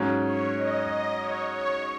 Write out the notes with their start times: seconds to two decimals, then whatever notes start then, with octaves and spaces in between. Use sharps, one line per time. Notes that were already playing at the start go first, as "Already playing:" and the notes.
Already playing: G#2 F#3 C#4
0.21 C#5
0.54 D#5
0.86 D#5
1.18 C#5
1.51 C#5